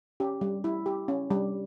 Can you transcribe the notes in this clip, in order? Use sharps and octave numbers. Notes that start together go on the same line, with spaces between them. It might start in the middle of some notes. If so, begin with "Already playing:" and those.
C#4 G4
G3
E4
G4
C#4
G3